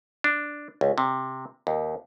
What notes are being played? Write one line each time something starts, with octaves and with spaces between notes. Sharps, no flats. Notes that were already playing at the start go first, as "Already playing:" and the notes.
D4
C#2
C3
D#2